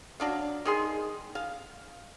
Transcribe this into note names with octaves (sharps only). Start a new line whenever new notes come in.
F#3 D4 F5
D#3 G#4 C6
F5